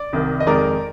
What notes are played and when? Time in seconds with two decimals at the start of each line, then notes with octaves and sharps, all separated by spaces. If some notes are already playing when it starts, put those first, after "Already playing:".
Already playing: D5
0.13 C2 C3 D#3
0.40 D#5
0.47 F2 D#3 G#3 A#4 D5